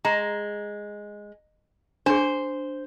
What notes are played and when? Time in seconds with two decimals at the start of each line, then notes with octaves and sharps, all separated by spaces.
0.05 G#3 A#5
2.06 D4 G#4 C5